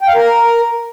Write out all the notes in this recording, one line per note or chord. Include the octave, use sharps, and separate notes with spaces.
G5
F5
A#4